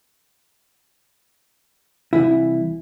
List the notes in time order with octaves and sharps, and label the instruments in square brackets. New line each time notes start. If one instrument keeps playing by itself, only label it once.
[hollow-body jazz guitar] C2 F#2 E3 E4